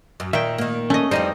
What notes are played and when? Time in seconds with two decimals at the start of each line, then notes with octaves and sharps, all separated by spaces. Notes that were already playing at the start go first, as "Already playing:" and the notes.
0.20 F#2
0.33 A#2 D#3 E5 G5
0.58 D#3 A#3
0.90 A3 C#4 D#5
1.11 F2 E3 G3 D#4 C5 D#5